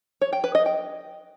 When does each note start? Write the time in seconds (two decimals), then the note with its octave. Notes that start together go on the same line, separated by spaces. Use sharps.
0.22 C#5
0.33 G5
0.44 B4
0.55 D#5
0.66 G5